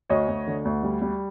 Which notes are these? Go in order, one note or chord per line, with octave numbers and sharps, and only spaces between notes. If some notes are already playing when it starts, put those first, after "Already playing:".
D2 C#5 D#5
D2
D3
D2
G3
G3